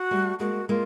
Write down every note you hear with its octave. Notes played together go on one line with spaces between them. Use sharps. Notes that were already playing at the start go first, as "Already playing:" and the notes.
Already playing: F#4
G3 A3
G#3 A#3 F#4
G#3 A#3 F4